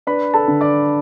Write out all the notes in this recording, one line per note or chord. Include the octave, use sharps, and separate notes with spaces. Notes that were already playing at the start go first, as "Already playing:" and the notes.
D4 B4 B5
A4 A5
D3
D5 D6